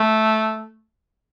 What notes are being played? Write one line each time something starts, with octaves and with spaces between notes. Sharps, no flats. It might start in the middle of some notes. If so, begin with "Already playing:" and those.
Already playing: A3